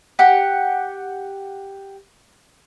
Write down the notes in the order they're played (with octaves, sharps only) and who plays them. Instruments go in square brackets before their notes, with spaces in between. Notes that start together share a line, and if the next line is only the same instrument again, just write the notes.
[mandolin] G4 F#5